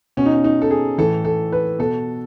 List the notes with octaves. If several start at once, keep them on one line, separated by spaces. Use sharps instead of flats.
B2 C#4
D#4
C#4
D#4
A4
G#4
A2 E3 A4
A4
B4
B2 A4